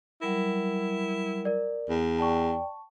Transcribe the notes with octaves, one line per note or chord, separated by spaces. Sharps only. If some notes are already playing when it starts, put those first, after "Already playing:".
F#3 G3 E4 A#4
A#4 D5
E2
D5 G5 A5 C#6